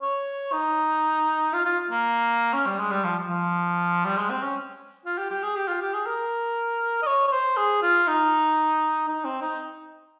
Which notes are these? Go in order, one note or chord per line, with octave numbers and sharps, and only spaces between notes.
C#5
D#4
F4
F4
A#3
C#4
G3
G#3
G3
F3
F3
G3
G#3
C4
C#4
F4
G4
G4
G#4
G4
F4
G4
G#4
A#4
D#5
C#5
C#5
C5
G#4
F4
D#4
D#4
C4
D#4